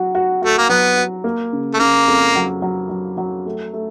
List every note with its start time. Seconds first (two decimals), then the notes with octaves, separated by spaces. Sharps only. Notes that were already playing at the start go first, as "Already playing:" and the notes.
Already playing: F#3 F#4
0.15 F#4
0.42 A3 F#4
0.58 A#3
0.69 F#3 B3
0.97 F#4
1.24 A#3
1.53 C#3
1.74 A3
1.80 C#3 A#3
2.08 F2
2.36 F#3
2.62 F#3
2.90 F#3
3.18 F#3
3.46 A3
3.74 A3